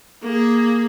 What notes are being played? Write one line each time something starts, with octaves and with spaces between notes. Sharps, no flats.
A#3 G#4